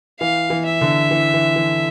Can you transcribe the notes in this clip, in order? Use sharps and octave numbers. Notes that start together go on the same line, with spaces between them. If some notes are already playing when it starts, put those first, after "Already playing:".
E3 F5
E3
E5
D3
E3
E3
E3